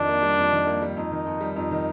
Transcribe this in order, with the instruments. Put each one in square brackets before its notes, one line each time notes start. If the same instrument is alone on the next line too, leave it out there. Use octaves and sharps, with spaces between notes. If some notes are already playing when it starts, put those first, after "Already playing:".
Already playing: [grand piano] F2 D#3 [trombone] D4
[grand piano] A#3
G3
F2
D#3
A#3
G3
[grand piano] F2 [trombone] D#4
[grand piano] D#3
F2
G3
[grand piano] F2 [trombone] D#4
[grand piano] D#3